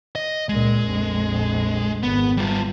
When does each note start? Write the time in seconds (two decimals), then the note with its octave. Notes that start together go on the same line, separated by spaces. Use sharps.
0.15 D#5
0.49 C#2 A#2 G#3
0.84 A#1 F2
2.03 G#1 B3
2.37 G3 F4